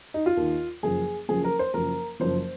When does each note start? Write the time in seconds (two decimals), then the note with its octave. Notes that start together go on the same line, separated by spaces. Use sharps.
0.14 D#4
0.26 F4
0.37 D#2 D#3
0.83 F#1 F#2 F3 G#4
1.29 F#1 F#2 F3 G#4
1.44 A#4
1.59 C5
1.74 F#1 F#2 F3 A#4
2.20 F#1 F#2 F3 C5